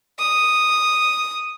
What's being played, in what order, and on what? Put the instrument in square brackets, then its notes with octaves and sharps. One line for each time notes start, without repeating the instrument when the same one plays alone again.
[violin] D#6